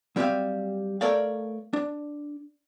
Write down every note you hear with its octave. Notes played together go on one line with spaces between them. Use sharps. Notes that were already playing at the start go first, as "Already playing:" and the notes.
F#3 G3 C4 G4 E5 F5
A3 A4 A#4 C#5 D5 F5
D4